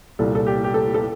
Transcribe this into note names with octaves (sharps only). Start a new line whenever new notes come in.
C2 A#2 A4
A4
G4
G4
A4
A4